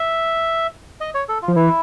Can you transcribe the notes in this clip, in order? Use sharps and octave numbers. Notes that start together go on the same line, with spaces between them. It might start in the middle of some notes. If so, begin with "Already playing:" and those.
Already playing: E5
D#5
C#5
A4
F4
F3
E3 E4